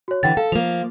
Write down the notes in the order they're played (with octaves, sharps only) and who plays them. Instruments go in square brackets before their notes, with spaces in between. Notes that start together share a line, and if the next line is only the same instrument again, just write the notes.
[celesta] F#4 C#5
[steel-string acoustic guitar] D3 E3 [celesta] F#5 G5 A6
[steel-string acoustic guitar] A4 [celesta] F5
[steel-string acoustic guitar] F3 A#3 [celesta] F7